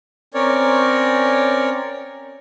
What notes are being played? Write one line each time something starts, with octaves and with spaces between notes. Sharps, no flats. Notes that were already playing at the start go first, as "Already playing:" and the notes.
C4 C#4 A#4 C#5 D5